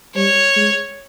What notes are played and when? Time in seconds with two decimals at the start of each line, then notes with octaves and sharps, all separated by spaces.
0.15 G3 C#5
0.56 G#3